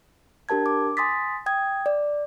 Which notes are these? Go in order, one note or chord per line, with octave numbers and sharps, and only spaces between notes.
D4 G4 A#4 A5 G#6
D6
G#5 C6 D#6 A6 B6
G5 D#6 G#6
D5